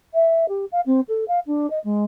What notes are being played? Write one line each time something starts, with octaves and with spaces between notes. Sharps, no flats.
E5
G4
F5
C4
A4
F5
D4
D#5
G#3